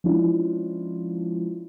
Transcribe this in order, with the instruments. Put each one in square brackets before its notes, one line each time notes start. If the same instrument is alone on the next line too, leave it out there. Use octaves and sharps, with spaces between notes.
[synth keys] F3 G#3 C#4 D4 E4 F4